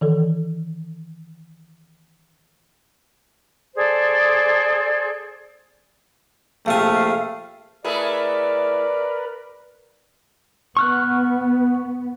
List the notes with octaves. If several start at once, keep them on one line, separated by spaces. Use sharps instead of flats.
D#3 E3 A4
G#4 A4 C5 D5
A#1 C3 A3 F5 G#5
A3 E4 G#4 A#4 B4 D5
B3 C#6 F6 F#6